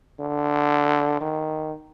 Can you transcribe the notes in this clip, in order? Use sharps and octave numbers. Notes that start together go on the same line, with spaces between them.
D3
D#3